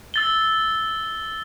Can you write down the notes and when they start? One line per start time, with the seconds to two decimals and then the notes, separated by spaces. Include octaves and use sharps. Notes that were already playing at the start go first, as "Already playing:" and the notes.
0.14 E6 A6 G7